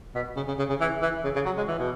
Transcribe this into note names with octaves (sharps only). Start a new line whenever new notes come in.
B2
C#3
C#3
C#3
C#3
E3
E3
C#3
C#3
F#3
G#3
E3
B2